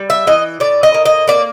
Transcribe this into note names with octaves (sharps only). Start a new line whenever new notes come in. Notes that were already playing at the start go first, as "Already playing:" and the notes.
Already playing: G3
E5
E3 D#5
A2 D5
D#5
A#3
D#5
A#3 D5